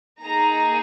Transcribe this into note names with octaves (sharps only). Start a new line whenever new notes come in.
A#3 D#4 G#4 A#5